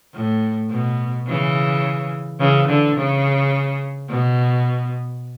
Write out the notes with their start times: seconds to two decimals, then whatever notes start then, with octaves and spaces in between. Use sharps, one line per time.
0.14 A2
0.70 B2
1.27 C#3 E3
2.39 C#3 E3
2.68 D3
2.97 C#3
4.09 B2